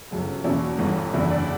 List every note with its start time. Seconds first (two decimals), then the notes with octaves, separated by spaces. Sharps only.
0.11 G1 F#2 C#3
0.44 E2 B2 A#3 C#4 E4
0.78 G1 G2 E3 B3
1.13 F#1 E2 D3 E4
1.30 D4